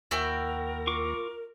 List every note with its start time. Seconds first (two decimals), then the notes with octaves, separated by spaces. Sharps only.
0.11 D#2 A#3 E4 F#4 A#4 G5 A#6
0.87 F4 C#6 D6